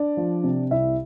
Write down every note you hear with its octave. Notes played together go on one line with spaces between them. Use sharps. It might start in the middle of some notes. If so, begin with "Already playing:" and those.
Already playing: D4 D5
F3
C3
C2 E4 E5